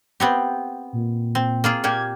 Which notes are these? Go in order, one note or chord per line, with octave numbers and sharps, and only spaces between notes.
B3 C4 G4
A#2
C4
A#3 F4 G#4
A#2 A#3 G4 G#6